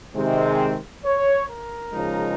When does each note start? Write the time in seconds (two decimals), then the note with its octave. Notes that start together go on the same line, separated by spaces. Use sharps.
0.15 C3 D#3 G#3 C4
1.05 C#5
1.49 A#4
1.93 C#3 F3 G#3 D#4